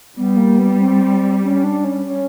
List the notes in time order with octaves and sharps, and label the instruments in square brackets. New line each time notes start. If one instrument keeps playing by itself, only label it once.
[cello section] G3 [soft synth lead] B3
[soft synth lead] A#3
B3
C4
C#4
D4
C#4
C#4